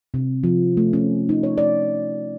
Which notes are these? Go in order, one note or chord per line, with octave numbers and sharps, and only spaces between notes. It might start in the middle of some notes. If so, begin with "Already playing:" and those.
C3
F3
A3
C#4
D#4
C#5
D5